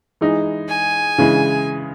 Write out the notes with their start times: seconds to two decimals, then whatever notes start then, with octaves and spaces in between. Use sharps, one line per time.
0.21 E3 G#3 D#4
0.69 G#5
1.18 C#3 E3 G#3